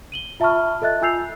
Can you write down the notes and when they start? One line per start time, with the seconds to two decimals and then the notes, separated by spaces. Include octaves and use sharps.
0.12 D#7 F#7 G7
0.40 F4 E5 A5 B5 C#6 F6
0.82 A4 D#5 E5 F#6 A6
1.02 F4 G#5 E6 G6 C7 F7